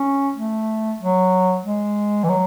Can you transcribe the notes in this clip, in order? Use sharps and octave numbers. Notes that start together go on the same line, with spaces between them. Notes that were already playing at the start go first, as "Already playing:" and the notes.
Already playing: C#4
A3
F#3
G#3
E3
F#3